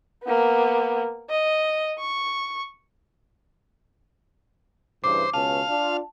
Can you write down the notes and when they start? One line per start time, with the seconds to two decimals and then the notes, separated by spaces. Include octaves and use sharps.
0.24 A#3 B3
1.30 D#5
2.00 C#6
5.04 G2 C#3 E3 C5 D6
5.34 C#2 B2 C#4 F5 A5
5.69 D4 F4